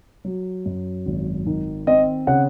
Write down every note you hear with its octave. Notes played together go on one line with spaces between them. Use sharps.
F#3
F#2
G#1
D#3
C4 D#5
C#3 F#5